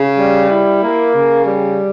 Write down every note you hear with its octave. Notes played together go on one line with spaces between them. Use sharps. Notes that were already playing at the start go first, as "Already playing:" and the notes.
Already playing: C#3
G3
E4
A#3
C#3
G3